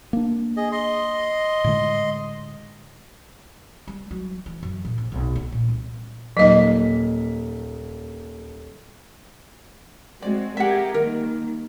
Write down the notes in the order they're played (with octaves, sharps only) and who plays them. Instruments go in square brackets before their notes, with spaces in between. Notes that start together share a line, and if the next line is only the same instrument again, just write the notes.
[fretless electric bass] A#3 D4
[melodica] G#4 D#5
D#5 C6
[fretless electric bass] A2 D3 G#3
[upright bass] G3
F#3
E3
F#2
A#2
A#1
B1
E4
A#2
C2
[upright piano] D#1 A#3 B6 [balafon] F#3 D#5
[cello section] G#3 C4 F#4 [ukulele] D5
[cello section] G4 G#4 A#4 [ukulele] E5 F#5
[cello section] D#3 G3 A#3 [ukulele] A#4